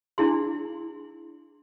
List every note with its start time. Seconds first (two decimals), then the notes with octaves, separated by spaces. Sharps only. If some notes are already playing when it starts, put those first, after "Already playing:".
0.18 D4 E4 G#4 C6